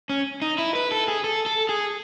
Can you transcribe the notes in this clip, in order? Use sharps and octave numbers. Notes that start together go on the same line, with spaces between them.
C#4
D#4
E4
B4
A4
G#4
A4
A4
G#4